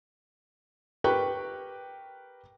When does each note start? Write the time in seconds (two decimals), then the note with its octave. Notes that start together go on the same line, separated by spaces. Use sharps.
1.04 G4 A#4 B4 G5 C#6 F#6